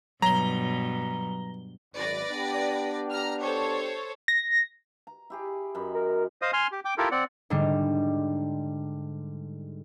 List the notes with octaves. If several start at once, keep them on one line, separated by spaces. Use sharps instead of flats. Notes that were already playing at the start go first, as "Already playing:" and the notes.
G2 B2 F#3 A#5 G7
G#1 F#2 B4 D5 A#6
B3 D4 G4
A#5 F6
A4 C5 C#5
A#6
A#5
E4 G4 G#4
F#2 D#4 B5
A#4
C5 D#5 F5 D#6
G#5 C6 F6
G4
G5 D6
E4 F4 G4 A4 A#4
C4 D5 F#5
G#2 D3 G3